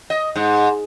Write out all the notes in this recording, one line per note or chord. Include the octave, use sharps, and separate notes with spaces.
D#5
G#2